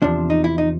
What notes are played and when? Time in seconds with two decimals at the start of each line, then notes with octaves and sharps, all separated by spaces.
0.02 E2 C3 F3 D4
0.30 D#4
0.44 E4
0.58 D#4